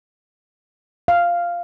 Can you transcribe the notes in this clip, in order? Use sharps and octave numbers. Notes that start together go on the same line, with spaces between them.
F5